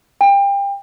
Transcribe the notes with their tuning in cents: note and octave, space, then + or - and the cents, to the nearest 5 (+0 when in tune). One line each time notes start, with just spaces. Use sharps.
G5 +30